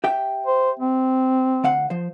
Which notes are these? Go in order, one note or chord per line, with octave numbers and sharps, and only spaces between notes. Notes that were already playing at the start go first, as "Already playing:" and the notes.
G4 E5 G5
C5
C4
D2 F5 F#5
F3 C5